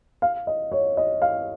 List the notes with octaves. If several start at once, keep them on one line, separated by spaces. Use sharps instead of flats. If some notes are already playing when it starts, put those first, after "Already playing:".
F5
D#5
C#5
D#5
F5